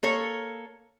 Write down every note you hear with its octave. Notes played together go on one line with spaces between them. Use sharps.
A#3 A4 C#5